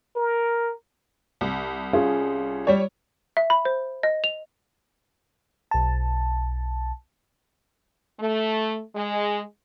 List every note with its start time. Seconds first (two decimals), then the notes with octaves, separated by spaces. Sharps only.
0.16 A#4
1.41 C2
1.93 C#4 F4 G#4
2.67 G3 C#5
3.37 E5
3.50 B5
3.65 C5
4.03 D#5
4.24 F7
5.71 B1 A5
8.20 A3
8.96 G#3